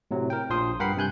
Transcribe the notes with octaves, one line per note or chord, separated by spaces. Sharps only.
A2 C3 F#3
A#4 G5
A#1 F3 C5 C6 D#6
G2 A#4 F#5 G5 B5 C7
G2 C3 G#5 F#6 G6